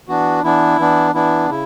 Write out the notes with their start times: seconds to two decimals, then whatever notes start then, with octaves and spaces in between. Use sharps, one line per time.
0.08 E3 B3 D4 F#4
0.44 E3 B3 D4 E4
0.79 E3 B3 D4
1.14 E3 B3 D4 E4
1.49 C#3 E4